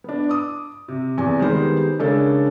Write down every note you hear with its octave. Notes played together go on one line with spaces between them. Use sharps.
B3 D4
D6 D#6
C3
E2 C3 G#5
D#3 G3 G#3 B3 D#4 C5
C#3 G#3 D4 A4 A#4 C#5